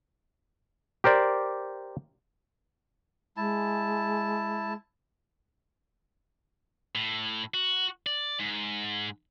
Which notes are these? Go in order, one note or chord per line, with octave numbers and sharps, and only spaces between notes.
G4 A#4 C5 D5
G#3 E4 A5
A2
F#4
D5
G#2